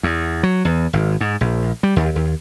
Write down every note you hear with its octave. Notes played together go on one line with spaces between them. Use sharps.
E2
F#3
E2
G#1
G#2
A#1
G3
D#2
D#2